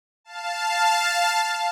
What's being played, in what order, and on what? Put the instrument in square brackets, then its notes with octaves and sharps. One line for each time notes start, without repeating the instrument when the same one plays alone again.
[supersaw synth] F5 A5